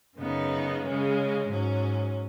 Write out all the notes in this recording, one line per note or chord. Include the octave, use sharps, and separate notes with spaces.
F#2 C#3 B3 D#4
C#3 G#3 C#4
G#2 F#3 C#4